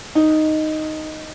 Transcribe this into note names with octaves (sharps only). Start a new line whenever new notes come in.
D#4